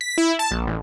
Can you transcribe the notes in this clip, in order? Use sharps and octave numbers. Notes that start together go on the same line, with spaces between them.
B6
E4
A5
A#1
A1